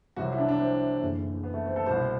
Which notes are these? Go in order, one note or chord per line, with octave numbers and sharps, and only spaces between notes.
C2 C3 F#3 F#4
E4
D4
D4
C4
F#1 E2 D3
B3
A3
C4
A4
C2 B2 G3 C5